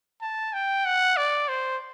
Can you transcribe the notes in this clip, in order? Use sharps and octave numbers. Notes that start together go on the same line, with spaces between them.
A5
G5
F#5
D5
C5